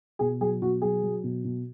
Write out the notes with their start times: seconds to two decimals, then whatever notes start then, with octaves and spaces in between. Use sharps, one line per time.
0.19 B2 G#4
0.41 F#3 G#4
0.61 B2 F#4
0.82 F#3 G#4
1.03 F#3
1.24 B2
1.44 B2